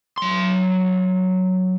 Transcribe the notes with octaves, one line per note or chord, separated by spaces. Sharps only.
F#3 C6